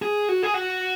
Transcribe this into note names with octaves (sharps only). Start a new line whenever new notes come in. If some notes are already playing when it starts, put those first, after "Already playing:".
G#4
F#4
G#4
F#4